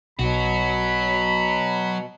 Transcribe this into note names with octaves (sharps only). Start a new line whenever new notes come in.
B1 B2 F#3 F#4 B5